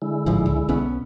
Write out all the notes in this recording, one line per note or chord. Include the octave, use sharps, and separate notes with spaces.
D3 G#3 E4
A1 G#2 F3
C#2
B1 B3 C#4